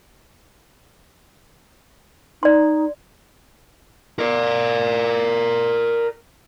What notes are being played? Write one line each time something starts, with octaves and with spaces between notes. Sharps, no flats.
D#4 D5 C6
A#4 D5